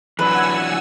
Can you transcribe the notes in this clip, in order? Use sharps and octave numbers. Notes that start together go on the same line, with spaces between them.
E3 F#3 D4 B4 F#5 G#5 E6